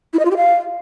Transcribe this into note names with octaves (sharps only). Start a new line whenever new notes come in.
E4
D#5
F4
G4
F5